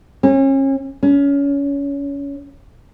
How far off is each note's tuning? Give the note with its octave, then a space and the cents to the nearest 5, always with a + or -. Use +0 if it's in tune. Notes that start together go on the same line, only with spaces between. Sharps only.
C#4 -35
C#4 +25